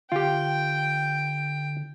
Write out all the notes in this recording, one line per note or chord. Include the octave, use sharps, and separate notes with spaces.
D3 F4 G4 G5